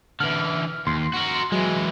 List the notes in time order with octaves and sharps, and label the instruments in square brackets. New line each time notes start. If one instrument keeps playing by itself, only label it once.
[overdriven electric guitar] D3 E3 [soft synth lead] F6
[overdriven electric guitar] D#2 [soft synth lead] C6
[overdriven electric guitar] F#4 A#4
[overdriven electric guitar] E3 G#3 [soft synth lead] F#3